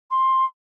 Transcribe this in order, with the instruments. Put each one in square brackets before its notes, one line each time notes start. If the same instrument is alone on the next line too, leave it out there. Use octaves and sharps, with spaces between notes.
[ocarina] C6